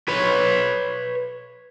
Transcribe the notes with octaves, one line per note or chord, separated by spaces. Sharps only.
B4 C#5